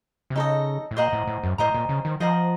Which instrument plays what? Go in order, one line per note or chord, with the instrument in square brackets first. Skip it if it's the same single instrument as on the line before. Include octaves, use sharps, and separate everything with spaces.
[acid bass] C3
[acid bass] C#3 [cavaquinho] D#4 A4 D#5
[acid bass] A2
[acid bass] A#2 [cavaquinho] C5 D#5 F#5 A#5
[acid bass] A2
A2
F#2
[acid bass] A2 [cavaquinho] C5 D#5 A#5
[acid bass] A#2
C#3
D#3
[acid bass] F3 [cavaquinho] C5 D#5 F#5 A#5